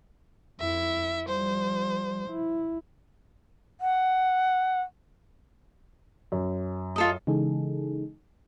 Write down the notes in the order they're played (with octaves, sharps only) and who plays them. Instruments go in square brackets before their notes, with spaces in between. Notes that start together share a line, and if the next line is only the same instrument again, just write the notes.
[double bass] F2 [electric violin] E4 E5
[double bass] F3 G3 [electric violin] C5
[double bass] E4
[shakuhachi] F#5
[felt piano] F#2
[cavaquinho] F4 A4 D#5
[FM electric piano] C#3 E3 G#3 D#4 G#4 A4